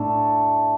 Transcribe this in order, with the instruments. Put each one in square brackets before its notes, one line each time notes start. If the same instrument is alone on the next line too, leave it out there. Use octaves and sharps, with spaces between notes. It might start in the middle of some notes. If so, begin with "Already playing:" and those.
Already playing: [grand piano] A2 [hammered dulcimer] A3 D4